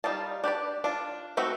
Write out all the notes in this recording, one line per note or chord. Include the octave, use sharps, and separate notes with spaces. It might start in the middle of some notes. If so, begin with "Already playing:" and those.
G3 D#4 F4 A5
D4 G4 B4 D5
D4 F4
A3 C4 D#4 F#4 B4